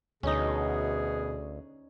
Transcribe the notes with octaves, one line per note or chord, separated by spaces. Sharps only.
D2 B2 C#4 D#4 G#4